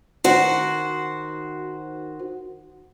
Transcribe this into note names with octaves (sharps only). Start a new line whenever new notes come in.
D#3 F#4 C5